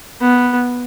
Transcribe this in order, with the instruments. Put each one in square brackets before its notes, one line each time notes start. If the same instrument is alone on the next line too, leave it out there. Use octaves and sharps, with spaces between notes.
[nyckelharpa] B3